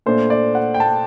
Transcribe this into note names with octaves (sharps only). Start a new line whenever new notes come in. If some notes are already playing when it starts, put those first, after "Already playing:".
A#2 A3 D4 C5
D5
F#5
G5
A5